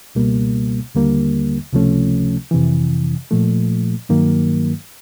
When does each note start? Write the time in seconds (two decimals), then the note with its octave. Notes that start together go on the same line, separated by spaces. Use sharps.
0.15 C#2 B2 G3 A#3
0.95 D#2 D3 G3 A#3
1.72 C#2 C3 F3 A3 C#4
2.51 F2 C3 E3
3.31 A#2 F3 A3
4.09 G2 D#3 F#3 A#3